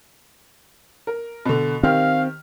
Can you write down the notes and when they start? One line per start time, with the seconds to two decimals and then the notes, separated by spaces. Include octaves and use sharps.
1.07 A#4
1.45 B2 D3
1.83 D#3 C4 G4 F5 F6